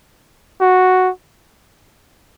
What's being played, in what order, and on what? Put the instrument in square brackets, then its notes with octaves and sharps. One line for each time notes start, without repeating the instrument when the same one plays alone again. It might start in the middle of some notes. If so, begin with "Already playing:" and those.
[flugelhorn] F#4